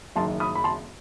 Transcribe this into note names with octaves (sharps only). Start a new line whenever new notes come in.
F#1 F#2 D#3 A5 C6
B5 D#6
B5
A5 C6